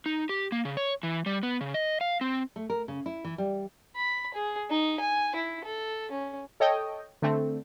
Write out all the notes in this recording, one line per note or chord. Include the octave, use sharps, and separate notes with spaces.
D#4
G4
A#3
C#3
C#5
E3
G3
B3
C#3
D#5
F5
C4
A3
A#4
C#3
E4
E3
G3
B5
G#4
D#4
G#5
E4
A4
C#4
A4 C#5 D#5 G5
D3 A3 C4